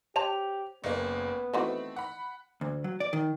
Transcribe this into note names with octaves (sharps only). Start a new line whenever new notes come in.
G4 C5 C#5 A5 F7
F#1 A#3 B3
D#3 E3 A3 C4 F#4
F#5 B5
D2
F#3
D5
D#3